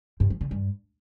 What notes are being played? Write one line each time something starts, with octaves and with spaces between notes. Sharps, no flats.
G2
F3
D3
G2